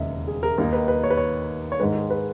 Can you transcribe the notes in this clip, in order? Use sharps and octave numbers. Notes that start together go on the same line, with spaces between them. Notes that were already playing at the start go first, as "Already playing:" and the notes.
Already playing: E1 D#2 C#3 D#5 E5
G#4
A#4
D#2 D#3 A#3 D#4 A#4
B4
B4
C#5
B4
C#5
C#5
G#2 D#3 G#3 B4
G#4
B4